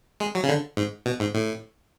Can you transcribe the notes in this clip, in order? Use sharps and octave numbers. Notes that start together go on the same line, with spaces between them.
G#3
F#3
C#3
D3
G#2
B2
G#2
A2